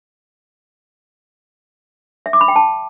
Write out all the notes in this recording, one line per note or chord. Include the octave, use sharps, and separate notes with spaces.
E5
D6
B5
G5
A5